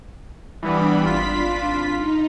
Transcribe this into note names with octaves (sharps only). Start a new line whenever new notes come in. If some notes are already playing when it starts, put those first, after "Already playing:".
E3 G3 B3 D4 B5
G#1 F4 B6
D#4